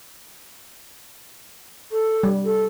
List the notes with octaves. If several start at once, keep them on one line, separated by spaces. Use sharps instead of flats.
A4
G3
A4